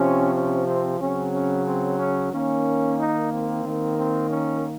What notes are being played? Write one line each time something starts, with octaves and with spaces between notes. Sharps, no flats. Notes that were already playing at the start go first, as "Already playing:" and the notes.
Already playing: C3 F3 C4 C#4
C#4
C4
C#3 F#3 C4 C#4
C#4
C4
C#4
D#3 A#3 C#4
D#4
C4
D#3 A#3
C4
C#4